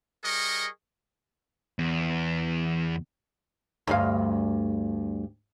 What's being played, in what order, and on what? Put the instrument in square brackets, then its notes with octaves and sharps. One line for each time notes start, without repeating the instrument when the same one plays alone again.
[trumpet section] G3 G#4 A#4 D#5 C#6
[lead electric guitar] E2
[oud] D2 G2 F5